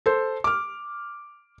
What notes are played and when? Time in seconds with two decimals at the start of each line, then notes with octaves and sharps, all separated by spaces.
0.06 A4 C5
0.44 D6 F6